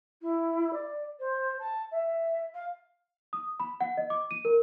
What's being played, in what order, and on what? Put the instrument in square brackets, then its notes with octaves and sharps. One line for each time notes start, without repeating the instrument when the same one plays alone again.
[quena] E4
D5
C5
A5
E5
F5
[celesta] D#6
B5
F#5
D#5
D6
D#7
A#4